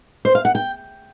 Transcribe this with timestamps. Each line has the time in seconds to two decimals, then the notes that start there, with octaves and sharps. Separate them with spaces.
0.25 C5
0.35 F5
0.45 F#5
0.55 G5